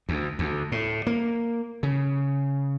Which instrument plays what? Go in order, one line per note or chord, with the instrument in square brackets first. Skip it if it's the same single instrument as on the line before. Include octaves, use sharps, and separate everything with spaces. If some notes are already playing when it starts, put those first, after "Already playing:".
[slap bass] D2
D2
A2
A#3
C#3